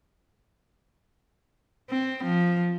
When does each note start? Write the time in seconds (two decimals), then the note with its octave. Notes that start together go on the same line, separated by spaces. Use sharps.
1.90 C4
2.24 F3